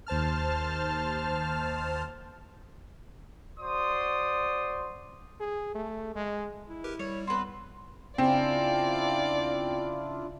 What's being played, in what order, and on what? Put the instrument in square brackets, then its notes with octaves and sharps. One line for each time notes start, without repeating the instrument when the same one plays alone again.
[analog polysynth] D#2 C5 A5 F6
[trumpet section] F#4 C5 D5 C6 D#6
[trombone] G#4
A3
G#3
[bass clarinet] E4
[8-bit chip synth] G4 A#4 B4
[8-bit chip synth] G3 [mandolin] C#5
[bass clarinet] B3 [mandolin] C4 B4 [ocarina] C6
[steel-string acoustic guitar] C#3 [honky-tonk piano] C4 [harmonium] D4 E4 F4 [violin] D5 F5